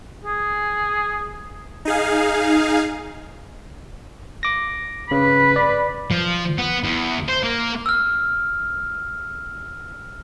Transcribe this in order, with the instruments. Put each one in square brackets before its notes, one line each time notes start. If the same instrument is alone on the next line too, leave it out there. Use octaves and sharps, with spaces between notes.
[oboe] G#4
[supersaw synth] D#4 G#4 F5
[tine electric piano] D6 A#6
[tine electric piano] C#3 [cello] B4
[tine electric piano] D5
[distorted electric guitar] F3
B3
E2
C5
A#3
[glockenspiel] E6 F6